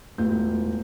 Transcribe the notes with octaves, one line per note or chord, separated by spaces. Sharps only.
E1 A2 F4 G6